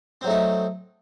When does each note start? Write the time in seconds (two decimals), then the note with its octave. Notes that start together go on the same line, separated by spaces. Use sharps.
0.21 C4
0.24 F#3
0.27 A3
0.30 D#4